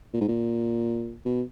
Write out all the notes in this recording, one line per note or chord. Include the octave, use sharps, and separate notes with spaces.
A#2
G#2
A#2
B2